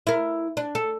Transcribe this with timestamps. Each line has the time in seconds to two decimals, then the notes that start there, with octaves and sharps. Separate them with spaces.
0.07 E4 A#4
0.57 D4
0.75 A4